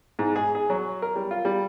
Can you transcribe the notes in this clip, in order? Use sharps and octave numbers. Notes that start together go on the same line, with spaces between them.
G#2
G#4
G#4
F#3
A#4
G3
F4
G3